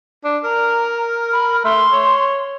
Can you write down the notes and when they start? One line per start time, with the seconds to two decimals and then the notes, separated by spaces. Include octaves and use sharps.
0.25 D4
0.44 A#4 A#5
1.33 B5
1.65 A3 C6
1.93 C#5